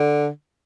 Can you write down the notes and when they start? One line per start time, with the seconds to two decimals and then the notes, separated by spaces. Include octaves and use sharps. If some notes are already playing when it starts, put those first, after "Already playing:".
Already playing: D3